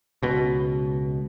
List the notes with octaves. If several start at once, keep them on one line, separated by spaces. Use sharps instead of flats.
C#2 B2